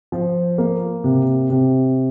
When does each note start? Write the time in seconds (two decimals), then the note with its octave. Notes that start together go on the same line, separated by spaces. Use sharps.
0.12 F3
0.58 A#3
1.04 C3
1.50 C3